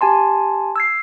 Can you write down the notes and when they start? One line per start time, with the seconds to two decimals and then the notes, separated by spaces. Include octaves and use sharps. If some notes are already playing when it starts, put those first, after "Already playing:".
0.01 G4 G#5 A5 C6
0.76 E6 G#6 C7